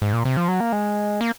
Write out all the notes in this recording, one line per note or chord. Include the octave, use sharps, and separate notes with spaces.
G#2
A#2
C3
F3
F#3
A#3
G#3
A#3